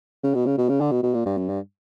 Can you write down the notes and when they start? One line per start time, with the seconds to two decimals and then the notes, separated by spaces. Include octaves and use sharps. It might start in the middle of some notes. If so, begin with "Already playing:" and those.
0.23 C#3
0.35 B2
0.46 C#3
0.58 B2
0.69 C#3
0.81 D3
0.91 B2
1.03 B2
1.14 A#2
1.26 G2
1.37 F#2
1.49 G2